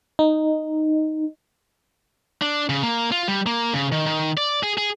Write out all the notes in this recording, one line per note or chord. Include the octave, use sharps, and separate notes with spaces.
D#4
D4
C#3
A#3
F4
G3
A#3
C#3
D#3
D#3
D5
G#4
G#4